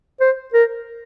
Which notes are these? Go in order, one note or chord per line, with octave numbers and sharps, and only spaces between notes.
C5
A#4